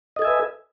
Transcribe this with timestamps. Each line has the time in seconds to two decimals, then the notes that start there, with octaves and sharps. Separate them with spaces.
0.16 D#5
0.19 A4
0.22 G#5
0.25 E5
0.27 B4